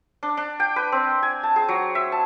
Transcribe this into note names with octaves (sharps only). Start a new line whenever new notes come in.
D4
D4
G5
B4
C4
G#5
A5
G#4
F#3
E5
A5